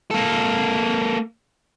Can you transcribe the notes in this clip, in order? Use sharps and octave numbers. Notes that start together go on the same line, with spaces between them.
A#3 A4